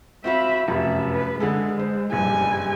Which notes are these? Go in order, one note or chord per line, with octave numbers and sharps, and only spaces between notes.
C4 F#4 E5 F5 B5
F1 F#2 E5
B4
D3 G#3 G#4 A4
C5
F#1 G2 G3 G#5